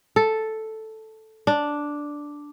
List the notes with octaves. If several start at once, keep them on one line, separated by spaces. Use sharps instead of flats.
A4
D4